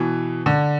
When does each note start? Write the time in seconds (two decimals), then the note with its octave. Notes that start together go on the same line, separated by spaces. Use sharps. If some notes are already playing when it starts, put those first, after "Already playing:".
Already playing: B2 E3
0.46 D3